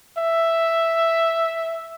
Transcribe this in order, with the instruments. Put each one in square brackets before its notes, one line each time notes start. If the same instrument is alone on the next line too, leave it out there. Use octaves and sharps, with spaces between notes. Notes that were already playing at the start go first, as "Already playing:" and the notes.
[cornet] E5